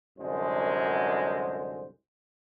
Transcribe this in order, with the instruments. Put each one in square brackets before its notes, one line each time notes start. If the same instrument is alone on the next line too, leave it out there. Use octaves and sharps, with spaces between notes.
[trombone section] C2 F#2 D3 G#3 C5